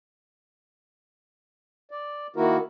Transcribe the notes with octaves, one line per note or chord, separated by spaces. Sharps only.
D5
D#3 A#3 E4 F#4 A#4